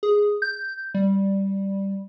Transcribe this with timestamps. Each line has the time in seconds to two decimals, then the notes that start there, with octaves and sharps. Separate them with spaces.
0.03 G#4
0.42 G6
0.95 G3